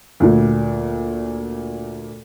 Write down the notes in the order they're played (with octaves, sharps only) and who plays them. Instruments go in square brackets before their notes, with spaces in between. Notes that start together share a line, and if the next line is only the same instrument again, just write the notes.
[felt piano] D2 A#2